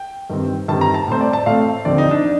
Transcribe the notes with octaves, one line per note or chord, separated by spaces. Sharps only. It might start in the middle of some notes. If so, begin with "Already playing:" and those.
Already playing: G5
G2 D#3 G3 C4
G2 D#3 G3 C4 A5
A#5
A5
A2 A3 C4 C5
D5
A5
A2 A3 C4 F5
D#2 D3 F3 C4 D5
D#4
D4